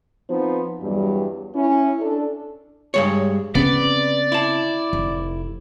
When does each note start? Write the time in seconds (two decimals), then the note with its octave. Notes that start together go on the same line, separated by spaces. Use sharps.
0.29 F3 B3 C4 D#4 C5
0.81 E2 G2 F#3 G3
1.55 C#4 E4
2.00 D4 A4
2.94 G2 G#3 C#5
3.55 C#3 B3 C4 D5
4.32 E4 A5
4.93 F1